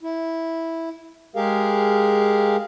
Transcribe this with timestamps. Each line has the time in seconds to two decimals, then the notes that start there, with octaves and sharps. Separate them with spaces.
0.03 E4
1.36 G#3 G4 G#4 A#4 F5